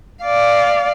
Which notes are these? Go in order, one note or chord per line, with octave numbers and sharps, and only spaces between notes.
D5 F5